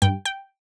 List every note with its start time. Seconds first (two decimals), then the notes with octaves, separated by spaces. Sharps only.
0.02 G2 G5
0.25 G5